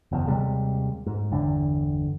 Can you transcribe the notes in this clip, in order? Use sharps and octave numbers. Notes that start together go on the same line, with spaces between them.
F#1 E2
D#2 C3 G3 G#3
G#2
G1 E2 D3